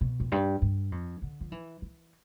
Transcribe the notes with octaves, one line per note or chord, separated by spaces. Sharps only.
B2
F2
G2
G2
F2
D3
F3
E3
E3